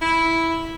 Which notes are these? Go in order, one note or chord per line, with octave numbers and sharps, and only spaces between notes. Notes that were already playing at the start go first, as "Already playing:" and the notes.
E4